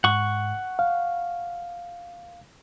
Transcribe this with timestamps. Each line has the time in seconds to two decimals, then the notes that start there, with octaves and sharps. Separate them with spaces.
0.04 G#2 F#5 C#6
0.79 F5